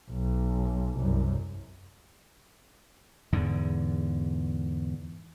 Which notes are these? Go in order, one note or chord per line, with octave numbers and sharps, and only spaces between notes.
B1
C2 F#2
E2 G#2 D3